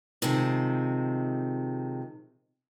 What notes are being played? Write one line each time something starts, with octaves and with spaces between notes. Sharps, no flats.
C3 D#3 F3 G#3